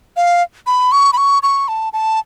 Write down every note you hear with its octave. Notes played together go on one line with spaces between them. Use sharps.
F5
B5
C#6
B5
C#6
C#6
A5
A5